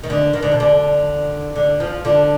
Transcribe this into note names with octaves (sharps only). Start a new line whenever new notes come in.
D#3
D3
D#3
D3
B2
D3
D3
F3
D3